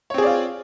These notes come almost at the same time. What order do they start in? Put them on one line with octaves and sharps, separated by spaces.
C#5 C4 G#4 D5 F4